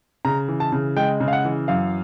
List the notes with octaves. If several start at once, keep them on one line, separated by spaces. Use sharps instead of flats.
C#3 A#5
E3
A5
C#3
G#3 G5
C#3
F5
F#5
E3
F#2 F5